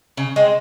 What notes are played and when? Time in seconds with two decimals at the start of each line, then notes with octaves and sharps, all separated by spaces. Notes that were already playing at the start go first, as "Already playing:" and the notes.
0.17 C#3
0.36 G#3 C4